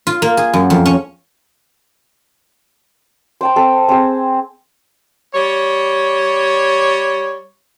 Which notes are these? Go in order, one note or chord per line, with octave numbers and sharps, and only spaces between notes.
F4
A#3
G#4
F#2
F2
C#4
C5 G5 A5
C4 A4
C4 G#4
G3 C#5